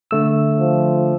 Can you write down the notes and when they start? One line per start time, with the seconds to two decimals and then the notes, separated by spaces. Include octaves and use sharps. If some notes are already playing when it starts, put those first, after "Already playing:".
0.11 D3 A3 E6
0.60 F3